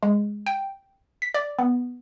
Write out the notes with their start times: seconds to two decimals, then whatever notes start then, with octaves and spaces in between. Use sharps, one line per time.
0.03 G#3
0.46 G5
1.22 B6
1.34 D5
1.59 B3